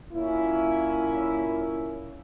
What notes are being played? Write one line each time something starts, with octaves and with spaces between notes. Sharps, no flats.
A#2 A#3 C#4 E4